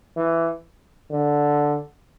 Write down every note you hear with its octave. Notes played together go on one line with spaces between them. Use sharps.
E3
D3